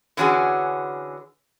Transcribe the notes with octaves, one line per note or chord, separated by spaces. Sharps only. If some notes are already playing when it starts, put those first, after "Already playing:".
D3 E3 C#4 F#4 G#4